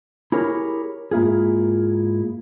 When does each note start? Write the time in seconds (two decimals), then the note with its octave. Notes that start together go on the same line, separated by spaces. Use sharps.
0.32 E4 G4 G#4 A#4 C#5
1.11 G#2 A#3 E4 F4 G#4